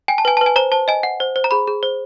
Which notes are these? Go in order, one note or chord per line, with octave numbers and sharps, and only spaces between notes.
G5 G#5
A5
B4 G#5
B4 A5
G#5
C5 A#5
C5 A5
D#5 G#5
F#5
C5
C5
A#5
G#4 B5
G#4
C5